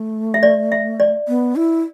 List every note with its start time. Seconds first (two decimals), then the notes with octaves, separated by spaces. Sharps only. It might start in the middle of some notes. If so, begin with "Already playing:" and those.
Already playing: A3
0.34 E5
0.43 D5
0.72 E5
1.00 D5
1.28 B3
1.56 E4